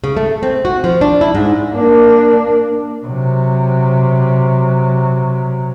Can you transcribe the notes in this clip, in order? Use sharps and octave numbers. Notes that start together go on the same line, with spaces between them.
C#3
A3
C4
F#4
F3
D4
E4
G#2
A#3 D4
C3 F#3